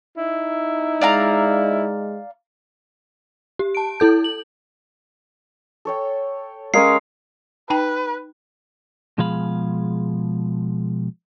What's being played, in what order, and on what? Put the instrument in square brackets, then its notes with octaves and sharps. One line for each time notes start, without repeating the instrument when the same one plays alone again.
[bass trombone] D#4 [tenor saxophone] E4
[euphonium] G#3 [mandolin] D5 F5 A#5
[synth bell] G4
A5 D7
E4 A4 G6
F#7
[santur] A4 C#5 G5
[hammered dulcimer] G#3 C#5 F5 [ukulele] C#4 A#4 [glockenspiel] C7
[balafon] D#4 G5 A5 [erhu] B4
[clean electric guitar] B2 F3 G#3 G#4 F5 B5